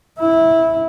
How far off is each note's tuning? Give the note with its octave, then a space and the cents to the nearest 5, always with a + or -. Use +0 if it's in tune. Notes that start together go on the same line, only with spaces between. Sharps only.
E4 -15